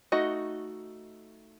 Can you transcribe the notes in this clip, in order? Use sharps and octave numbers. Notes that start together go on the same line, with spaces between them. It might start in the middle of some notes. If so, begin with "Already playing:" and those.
A3 D#4 F#4 D#5